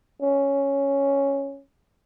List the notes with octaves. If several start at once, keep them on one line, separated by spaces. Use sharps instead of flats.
C#4